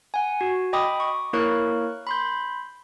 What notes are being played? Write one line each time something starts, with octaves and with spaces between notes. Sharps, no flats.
F#5 G#5
F#4
D#5 G5 B5 D6 D#6
C#6
A#3 E4 A#4 C#5 C#6 F#6
B5 C6 G6